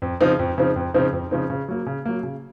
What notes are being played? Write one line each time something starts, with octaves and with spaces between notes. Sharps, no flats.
F2
C#3 F3 C4 D#4
F2
C#3 F3 C4 D#4
F2
C#3 F3 C4 D#4
F2
C#3 F3 C4 D#4
C#3
F#3 A#3
C#3
F#3 A#3
C#3